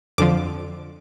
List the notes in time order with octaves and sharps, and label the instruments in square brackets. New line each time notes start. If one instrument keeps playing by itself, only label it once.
[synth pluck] F2 D3 F3 D6